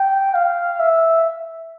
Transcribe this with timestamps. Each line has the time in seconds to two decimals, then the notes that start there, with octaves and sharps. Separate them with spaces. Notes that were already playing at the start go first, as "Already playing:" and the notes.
Already playing: G5
0.34 F5
0.80 E5